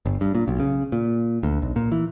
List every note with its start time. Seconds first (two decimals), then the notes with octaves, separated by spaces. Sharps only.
0.06 G1
0.21 G2
0.35 A#2
0.48 B1
0.60 C#3
0.92 A#2
1.43 D2
1.62 B1
1.76 A#2
1.92 E3